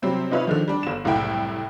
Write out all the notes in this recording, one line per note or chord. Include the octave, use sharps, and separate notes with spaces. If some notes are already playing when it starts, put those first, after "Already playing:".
C3 F#3 G3 C4 E4
C3 D#4 F4 B4 C#5 E5
D3 D#3 F3
G3 D4
G1 E7
F#1 C2 A2 E4 G5